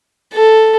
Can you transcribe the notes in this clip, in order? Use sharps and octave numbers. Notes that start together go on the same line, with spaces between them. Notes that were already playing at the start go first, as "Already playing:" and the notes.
A4